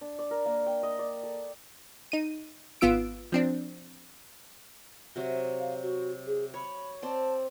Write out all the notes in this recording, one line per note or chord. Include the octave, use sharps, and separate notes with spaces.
D4
D5
A#4
A#3
G5
D#5
D5
A4
D#4 D#7
G#1 B3 F4 E6 D7
F3 C4 D4
C3 F#3 E5
F5
F#4
G#4
C#5 B5
C4 D5 A5